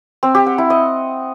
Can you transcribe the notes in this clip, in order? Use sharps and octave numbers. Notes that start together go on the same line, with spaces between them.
C4
G4
F#5
E4
D#5